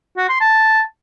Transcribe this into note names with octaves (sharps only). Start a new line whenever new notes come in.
F#4
C6
A5